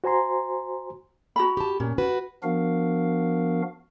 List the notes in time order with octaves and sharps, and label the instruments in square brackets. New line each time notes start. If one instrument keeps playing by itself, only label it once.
[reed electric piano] F#4 C5 G#5 A#5 C6
[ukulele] F#4 A#5 B5
[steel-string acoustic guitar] G4 A5
[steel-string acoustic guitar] A#2 [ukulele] C#4
[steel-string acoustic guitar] F#4 B4
[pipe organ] F3 B3 D4 F#4 A#4 F5